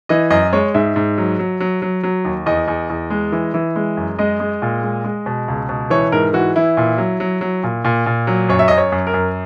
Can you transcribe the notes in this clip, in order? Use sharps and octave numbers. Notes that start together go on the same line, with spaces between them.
E3 D#5
F#2 D#5
G#3 C#5
G#2 E5
G#2
F#3
F#3
F#3
F#3
F#3
D#2
E2 D#5
E2
E2
G#3
E3
E3
G#3
F#2
G#3 D#5
G#3
A#2
G#3
G#3
B2
C#2
B2
E3 C#5
G#2 A#4
E3 F#4
E3 E4
A#2
F#3
F#3
F#3
A#2
A#2
A#2
F#3
F#2 C#5
E5
F#2 D#5
C#5
F#2
A#4
F#2